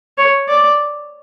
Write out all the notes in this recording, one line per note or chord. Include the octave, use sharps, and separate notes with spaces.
C#5
D5